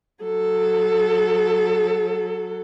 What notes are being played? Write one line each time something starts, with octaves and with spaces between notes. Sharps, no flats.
F#3 A4